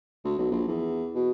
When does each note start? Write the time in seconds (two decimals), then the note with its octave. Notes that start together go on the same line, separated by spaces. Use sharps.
0.25 D2
0.38 B1
0.52 A#1
0.68 E2
1.15 B2